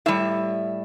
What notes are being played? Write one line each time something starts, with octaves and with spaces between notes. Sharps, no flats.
A2 G3 E5